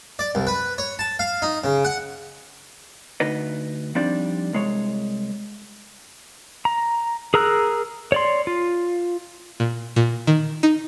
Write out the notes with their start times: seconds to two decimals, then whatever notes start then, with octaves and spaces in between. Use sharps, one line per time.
0.19 D5
0.35 C2
0.47 B4
0.78 C#5
0.99 A5
1.19 F5
1.42 D#4
1.64 C#3
1.85 F#5
3.20 D2 D#4 B4 D#5
3.95 F3 G3 C4 D4 D#4 D5
4.53 C2 G#3 C#5
6.65 A#5
7.34 G#4 A#4 A#5 E6 F#6
8.12 C#5 D5 C6
8.47 F4
9.60 A#2
9.96 A#2
10.27 D#3
10.63 D#4